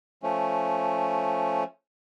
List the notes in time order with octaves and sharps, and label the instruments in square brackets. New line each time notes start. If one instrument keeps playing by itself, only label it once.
[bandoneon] F3 A3 C#4